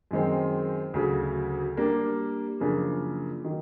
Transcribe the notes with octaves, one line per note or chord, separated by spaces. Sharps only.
F#2 D#3 G#3 C4
D2 C#3 F#3
G3 A#3 D4
F#2 C#3 F3 A#3 D4
D#3 F#3